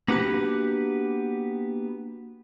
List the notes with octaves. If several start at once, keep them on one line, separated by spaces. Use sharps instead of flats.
A#3 B3 D4 F#4 G4 B4